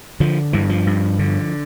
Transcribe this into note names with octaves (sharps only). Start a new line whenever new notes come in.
D3 F3
G2 E3
F3
G2
D3